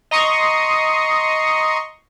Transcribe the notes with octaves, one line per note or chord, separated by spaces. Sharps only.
D#5 A#5 C6 C#6 D#6